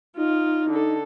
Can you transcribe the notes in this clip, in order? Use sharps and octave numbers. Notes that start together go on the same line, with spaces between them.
D#4 F4
D3 A4